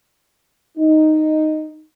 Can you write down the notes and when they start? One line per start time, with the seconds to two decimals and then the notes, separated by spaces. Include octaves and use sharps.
0.78 D#4